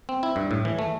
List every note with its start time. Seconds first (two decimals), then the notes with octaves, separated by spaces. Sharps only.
0.09 C4
0.23 E4
0.36 G2
0.51 A2
0.65 E3
0.79 A3